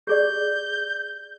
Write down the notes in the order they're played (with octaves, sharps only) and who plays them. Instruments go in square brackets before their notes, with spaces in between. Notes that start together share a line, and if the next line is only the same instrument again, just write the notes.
[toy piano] G4 G#4 D5 [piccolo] G6